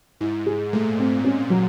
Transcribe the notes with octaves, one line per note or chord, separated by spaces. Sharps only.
G#2 E4
G#4
A#2 A3
C4
C#4
F#3